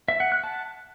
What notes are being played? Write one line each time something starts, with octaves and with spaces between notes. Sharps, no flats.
E5
F#5
F#6
A5